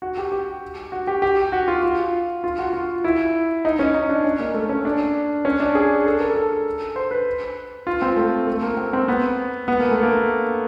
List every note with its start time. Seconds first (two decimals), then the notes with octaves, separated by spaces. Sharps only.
0.02 F#4
0.17 G4
0.32 G4
0.92 F#4
1.07 G4
1.22 G4
1.52 F#4
1.68 F4
1.82 F4
2.44 F4
2.59 F#4
2.73 F4
3.04 E4
3.65 D#4
3.79 C#4
3.94 D#4
4.09 D4
4.24 C#4
4.40 A#3
4.54 A3
4.69 C#4
4.85 D4
5.45 C#4
5.60 D4
5.75 G#4
6.06 A4
6.20 A#4
6.35 A4
6.96 C5
7.11 B4
7.87 F4
8.02 C4
8.17 A3
8.47 A3
8.62 A#3
8.77 C4
8.93 C4
9.08 B3
9.68 B3
9.80 A#3
9.91 A3
10.02 A#3